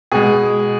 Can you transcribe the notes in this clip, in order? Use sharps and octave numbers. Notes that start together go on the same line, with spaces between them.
B2 G#3 G#4